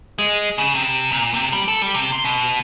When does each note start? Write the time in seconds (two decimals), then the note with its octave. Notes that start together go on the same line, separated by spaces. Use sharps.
0.18 G#3
0.58 C#3
0.75 C3
1.12 A#2
1.34 C3
1.52 G3
1.68 A4
1.82 G3
1.94 C3
2.12 C6
2.25 B2